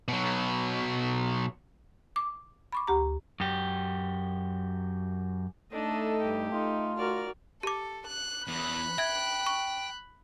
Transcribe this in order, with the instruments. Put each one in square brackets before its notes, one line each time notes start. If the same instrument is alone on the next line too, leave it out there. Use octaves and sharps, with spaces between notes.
[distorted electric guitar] B2 F#3
[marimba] D6
B5 C#6 D6
D2 G4 A#5
[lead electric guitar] F#2 G4
[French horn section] A3 [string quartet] D4 D#5 [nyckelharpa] D#4 A4
[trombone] G2 [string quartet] G4
[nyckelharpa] D#4 [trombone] F4
[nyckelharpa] F#4 [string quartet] A#4 D5 F6
[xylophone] G4 D6 [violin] A4
[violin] F#6
[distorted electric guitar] E2 [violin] B5 F#6
[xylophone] E5 G#6 [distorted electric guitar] G5
[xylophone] C#6